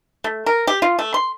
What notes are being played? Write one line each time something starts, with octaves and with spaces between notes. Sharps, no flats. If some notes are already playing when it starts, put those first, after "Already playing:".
A3
A#4
G4
F4
A3
C6